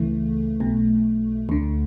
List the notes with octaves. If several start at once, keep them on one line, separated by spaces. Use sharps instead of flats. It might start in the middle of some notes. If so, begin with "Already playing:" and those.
Already playing: C#2 C#3 E3 A3
B1 B2
D2 D3